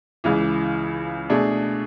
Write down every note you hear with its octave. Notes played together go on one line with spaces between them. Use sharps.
C#2 C#3 E3
B2 A3 D4 G#4